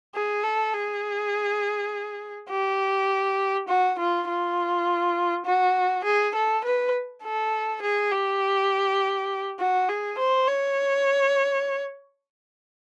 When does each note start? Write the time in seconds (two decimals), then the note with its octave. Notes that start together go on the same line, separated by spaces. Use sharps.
0.15 G#4
0.43 A4
0.73 G#4
2.50 G4
3.68 F#4
3.99 F4
4.28 F4
5.46 F#4
6.04 G#4
6.35 A4
6.64 B4
7.23 A4
7.82 G#4
8.11 G4
9.59 F#4
9.88 G#4
10.18 C5
10.48 C#5